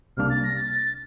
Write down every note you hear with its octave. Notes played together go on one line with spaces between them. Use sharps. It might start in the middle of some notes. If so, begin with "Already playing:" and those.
C2 C3 G3 A#3 D4 F6
A6
A#6
A6
A6